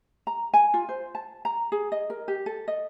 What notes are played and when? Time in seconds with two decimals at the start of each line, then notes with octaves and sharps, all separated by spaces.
0.27 A#5
0.54 G#5
0.74 F4
0.89 C5
1.15 A5
1.45 A#5
1.72 G#4
1.92 D#5
2.10 A#4
2.28 G4
2.46 A4
2.68 D#5